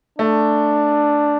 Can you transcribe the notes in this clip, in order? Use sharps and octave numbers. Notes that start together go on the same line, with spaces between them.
A3 D4